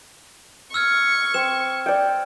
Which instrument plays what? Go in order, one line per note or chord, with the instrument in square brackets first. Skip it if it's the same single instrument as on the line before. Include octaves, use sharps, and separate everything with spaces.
[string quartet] C#6 [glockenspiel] E6 F6 G#6
[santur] C4 [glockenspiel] E7
[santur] D5 G5